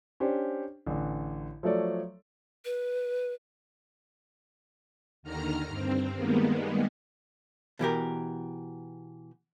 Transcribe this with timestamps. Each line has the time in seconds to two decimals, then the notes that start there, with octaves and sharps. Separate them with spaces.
0.20 C#4 D4 G4 C5
0.86 A1 D3
1.63 F3 F#3 A3 A4 C#5 D5
2.65 B4
5.23 D#2 D3 D#3 A#5 F6
5.67 G2 C4
6.14 D#3 G3 G#3 A#3 B3
7.79 B2 E3 G4 A#4